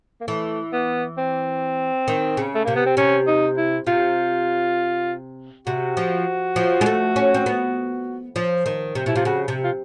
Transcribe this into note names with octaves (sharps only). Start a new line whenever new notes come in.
A#3
E3 A3
B3
C4
D#3
C#3
A3
C3 A#3
B3
C4
C3 C#4
D#4
E4
C3 F4
C3 F#4
F3
F3
G#3
A3
C#4
C4
B3
F3
D#3
C3
B2 E4
C3 F4
C#3 F#4
C3
F4